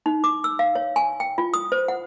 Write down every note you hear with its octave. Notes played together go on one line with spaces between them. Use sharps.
D#4
D6
E6
F5
C#5
G#5
G5
F4
D#6
C5
F#5